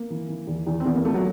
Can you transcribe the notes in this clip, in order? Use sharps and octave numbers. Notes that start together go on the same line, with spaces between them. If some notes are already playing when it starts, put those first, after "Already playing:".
Already playing: A#3
E3
E3
E2
E2
C4
E2 B3
A#3
F3 A3
F#3